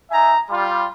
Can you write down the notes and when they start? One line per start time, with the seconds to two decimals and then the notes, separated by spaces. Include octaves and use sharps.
0.11 D#4 E5 G#5 A#5
0.50 G3 F4